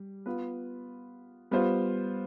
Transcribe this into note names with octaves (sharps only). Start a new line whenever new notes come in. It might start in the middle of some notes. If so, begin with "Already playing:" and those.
Already playing: G3
B3 F4 B4
G3 B3 F4 C5